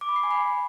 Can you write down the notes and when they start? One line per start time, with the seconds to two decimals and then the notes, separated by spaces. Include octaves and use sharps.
0.01 D6
0.09 B5
0.16 C7
0.23 G#5
0.31 B5